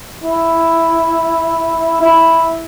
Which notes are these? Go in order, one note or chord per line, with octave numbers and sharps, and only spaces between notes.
E4
E4